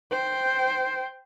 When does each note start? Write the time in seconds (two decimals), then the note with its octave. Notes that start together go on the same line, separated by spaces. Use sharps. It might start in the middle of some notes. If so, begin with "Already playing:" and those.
0.12 C5 G5